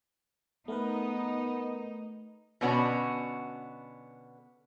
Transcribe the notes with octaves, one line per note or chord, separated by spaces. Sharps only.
A3 B3 D#4 A#4 B4
B2 D3 B3 C#4 F#4 A5